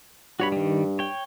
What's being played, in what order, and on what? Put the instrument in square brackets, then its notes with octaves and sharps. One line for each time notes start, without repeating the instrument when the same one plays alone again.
[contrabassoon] G2 [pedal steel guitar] F#4 C#5 B5
[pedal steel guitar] D#3 G3
C#5 G5